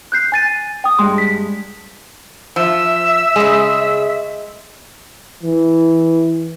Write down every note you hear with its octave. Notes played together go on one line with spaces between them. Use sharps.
F#6 G6 C7
G#5 A6 D#7
G5 D#6
G2 G#3 C6
B6
F3 E5 E6
C#3 G#3 G#4
E3